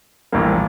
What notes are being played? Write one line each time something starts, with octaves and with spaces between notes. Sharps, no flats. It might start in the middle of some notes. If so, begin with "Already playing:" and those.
A#1 A2 E3 G3 A#3